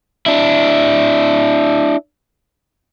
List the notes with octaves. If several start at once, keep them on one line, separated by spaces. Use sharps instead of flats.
D4 E4